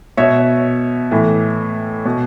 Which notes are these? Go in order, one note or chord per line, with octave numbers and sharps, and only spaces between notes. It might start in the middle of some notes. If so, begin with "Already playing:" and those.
B2 C#5 E5
A2 E3
B2